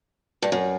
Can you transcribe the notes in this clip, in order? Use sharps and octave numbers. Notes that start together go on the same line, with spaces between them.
G2
F#2